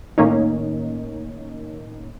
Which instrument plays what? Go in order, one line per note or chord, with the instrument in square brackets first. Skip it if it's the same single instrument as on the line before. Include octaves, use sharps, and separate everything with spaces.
[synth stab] A2 D#3 A#3 C#4 D#4